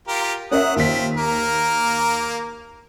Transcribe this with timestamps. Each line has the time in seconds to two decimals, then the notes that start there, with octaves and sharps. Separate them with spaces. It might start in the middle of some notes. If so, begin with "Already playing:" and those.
0.08 F4 G4 A#4
0.51 C#4 A#4 E5 F#5 D#6
0.76 D#2 C4 F4 B6
1.17 A#3 A#4